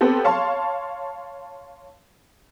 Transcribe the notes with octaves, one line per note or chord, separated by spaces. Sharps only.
B3 C4 G4 A4
C#5 F5 A5 C6